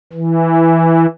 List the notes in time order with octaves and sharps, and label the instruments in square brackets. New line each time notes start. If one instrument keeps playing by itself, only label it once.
[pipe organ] E3